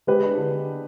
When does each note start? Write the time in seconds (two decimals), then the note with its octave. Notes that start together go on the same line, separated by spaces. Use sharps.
0.07 G#3 G4 B4
0.23 D4
0.38 D3